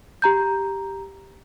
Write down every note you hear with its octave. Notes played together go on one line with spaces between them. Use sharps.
G4 A#5 G6